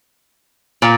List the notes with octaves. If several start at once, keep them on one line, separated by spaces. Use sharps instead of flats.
A#2